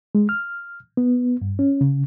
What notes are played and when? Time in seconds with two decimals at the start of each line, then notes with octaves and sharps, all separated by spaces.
0.15 G#3
0.29 F6
0.97 B3
1.42 G2
1.59 C#4
1.81 C#3